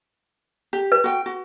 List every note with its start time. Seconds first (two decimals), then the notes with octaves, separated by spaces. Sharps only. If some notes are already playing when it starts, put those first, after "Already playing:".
0.73 G4
0.92 B4
1.04 F#4 G5
1.26 F#4